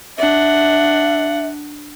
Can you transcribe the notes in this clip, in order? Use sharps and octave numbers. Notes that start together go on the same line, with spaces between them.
D4 E5 F#5